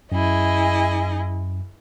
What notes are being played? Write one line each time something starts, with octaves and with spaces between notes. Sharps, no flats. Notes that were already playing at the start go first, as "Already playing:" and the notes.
F#2 E4 G#4 D#5